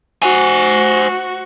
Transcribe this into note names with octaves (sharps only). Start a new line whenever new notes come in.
F#4 C5 G#5